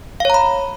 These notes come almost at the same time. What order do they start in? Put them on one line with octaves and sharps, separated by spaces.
F5 C#5 A#5 B5